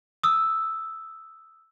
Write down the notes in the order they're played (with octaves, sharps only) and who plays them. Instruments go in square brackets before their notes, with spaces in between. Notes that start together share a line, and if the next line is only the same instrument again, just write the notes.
[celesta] D#6 E6